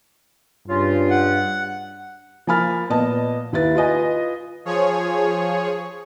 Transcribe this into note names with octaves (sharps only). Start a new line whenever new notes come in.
G2 C#3 C#4 F4
F#5
F3 A#3 G#5 B5 F6 A6
A#2 B3 D#5 A5
D#2 E4 B4 A6
F4 B4 D#5 G#5
F3 G#4 C#5